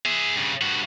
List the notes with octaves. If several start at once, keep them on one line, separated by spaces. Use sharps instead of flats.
G#4 E5
G2 C#3
G2 F#4